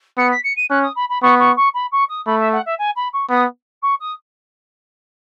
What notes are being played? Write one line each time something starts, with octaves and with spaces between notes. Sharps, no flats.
B3 C#7
B6
C#7
D#7
C#4 F#6
D#6
B5
B5
B3 C#6
C#6
C#6
B5
C#6
D#6
A3 B5
E5
F#5
E5
G#5
B5
C#6
B3 D#6
C#6
D#6